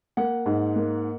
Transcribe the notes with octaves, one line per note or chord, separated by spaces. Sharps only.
A#3 F#5
G#2
A#3